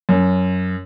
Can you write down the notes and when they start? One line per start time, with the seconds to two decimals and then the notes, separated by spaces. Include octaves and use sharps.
0.09 F#2